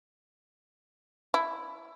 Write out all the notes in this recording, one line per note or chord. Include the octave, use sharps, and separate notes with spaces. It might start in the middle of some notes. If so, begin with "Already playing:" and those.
E4